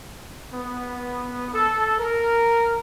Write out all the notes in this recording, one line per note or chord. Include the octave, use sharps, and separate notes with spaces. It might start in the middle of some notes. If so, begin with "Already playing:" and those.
B3
A4
A#4